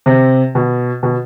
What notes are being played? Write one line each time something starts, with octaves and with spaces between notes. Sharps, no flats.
C3
B2
B2